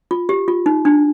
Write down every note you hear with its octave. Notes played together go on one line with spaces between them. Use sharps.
F4
G4
F4
D#4
D4